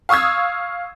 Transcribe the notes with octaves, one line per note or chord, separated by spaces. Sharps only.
F5 C#6 D#6 E6 G#6